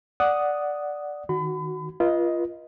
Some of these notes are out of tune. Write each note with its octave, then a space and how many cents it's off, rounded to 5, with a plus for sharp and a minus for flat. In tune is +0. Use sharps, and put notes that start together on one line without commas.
D5 +0 F#5 +0 D#6 +0
D#3 +0 F#4 +0 B5 +35
F4 -20 B4 -35 D#5 +10